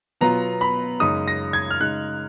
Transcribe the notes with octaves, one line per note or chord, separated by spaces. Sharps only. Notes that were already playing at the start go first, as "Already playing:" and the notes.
B2 F#3 B3 F4 A#5
B5
F#2 C#3 G#3 D#4 D#6
A#6
G#6
F6
C#3 G#3 D#4 F#6